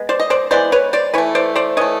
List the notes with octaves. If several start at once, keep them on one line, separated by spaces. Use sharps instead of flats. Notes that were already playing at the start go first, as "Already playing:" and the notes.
Already playing: G#3 B3
C5 D5
D#5
C5 D5
E3 G#3 B3 C5 D5
B4 C#5
C5 D5
E3 A3 B4 C#5
C5 D5
C5 D5
E3 A3 C#5 D#5